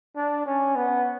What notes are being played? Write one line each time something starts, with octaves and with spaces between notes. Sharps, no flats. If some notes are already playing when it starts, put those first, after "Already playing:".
D4
C#4
B3